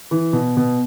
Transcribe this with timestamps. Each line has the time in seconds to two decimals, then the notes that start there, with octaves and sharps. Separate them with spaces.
0.11 E3
0.33 B2
0.57 B2